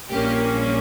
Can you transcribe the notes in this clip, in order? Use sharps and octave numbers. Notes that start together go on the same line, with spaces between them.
A#1 A#2 G3 A#3 C#4 G4